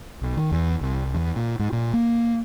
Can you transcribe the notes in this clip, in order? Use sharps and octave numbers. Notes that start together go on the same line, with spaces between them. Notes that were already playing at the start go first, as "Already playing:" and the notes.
B1
D#3
E2
C2
E2
A#2
G#2
A#2
A#3